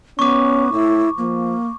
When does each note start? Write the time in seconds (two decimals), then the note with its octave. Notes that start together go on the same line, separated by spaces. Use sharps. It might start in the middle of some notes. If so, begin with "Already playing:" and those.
0.19 B3 C#4 C#6 D6
0.72 A2 E4
1.18 F3 A#3